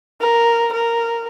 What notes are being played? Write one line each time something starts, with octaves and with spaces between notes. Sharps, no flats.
A#4
A#4